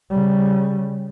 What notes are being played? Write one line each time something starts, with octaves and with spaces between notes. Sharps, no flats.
C#3 G3